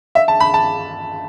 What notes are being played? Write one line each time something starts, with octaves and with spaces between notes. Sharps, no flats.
E5
A5
B5
A5